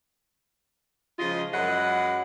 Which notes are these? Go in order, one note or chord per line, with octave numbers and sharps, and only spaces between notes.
C#3 F3 G#3 F4 D#5
F#2 F#3 G#3 F#5 B5